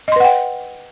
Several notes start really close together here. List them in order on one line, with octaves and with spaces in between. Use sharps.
D#5 C6 B4 F#5 G5